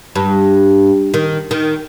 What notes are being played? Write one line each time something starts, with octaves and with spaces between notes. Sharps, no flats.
G2
D#3
D#3